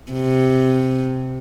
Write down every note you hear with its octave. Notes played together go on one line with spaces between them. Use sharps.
C3